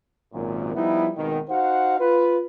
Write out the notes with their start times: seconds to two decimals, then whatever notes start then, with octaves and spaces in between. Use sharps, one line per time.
0.32 G#1 F#2 A#2
0.75 F3 G3 B3 D#4 E4
1.17 G#1 B2 D#3
1.49 D#4 F#4 C5 F5 F#5
1.99 F4 B4